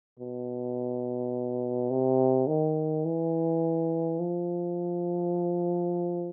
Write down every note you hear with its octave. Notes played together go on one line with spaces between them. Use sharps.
B2
C3
D#3
E3
F3